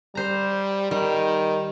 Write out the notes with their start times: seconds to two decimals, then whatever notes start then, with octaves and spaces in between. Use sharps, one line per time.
0.15 G3 C5 A#5
0.91 D#3 G3